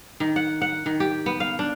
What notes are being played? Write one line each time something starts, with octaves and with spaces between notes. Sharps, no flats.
D#3
F#5
F#5
D#3
G4
B3
F5
D4